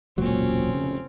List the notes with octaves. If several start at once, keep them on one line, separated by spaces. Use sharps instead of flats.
E1 C#2 A#2 F#3 C4 C#4
F1 C#3